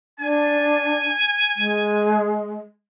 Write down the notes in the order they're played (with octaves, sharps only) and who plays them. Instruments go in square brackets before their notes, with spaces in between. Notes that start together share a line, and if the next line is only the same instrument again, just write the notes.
[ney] D4 [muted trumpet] G#5
[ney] G#3